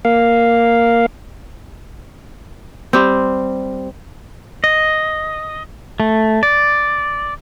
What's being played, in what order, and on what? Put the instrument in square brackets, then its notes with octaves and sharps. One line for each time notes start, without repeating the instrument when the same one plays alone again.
[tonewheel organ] A#3 F5
[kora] G3 C4
[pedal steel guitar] D#5
A3
D5